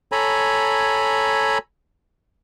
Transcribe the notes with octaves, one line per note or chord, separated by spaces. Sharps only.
A4 C#5 G#5 A#5 B5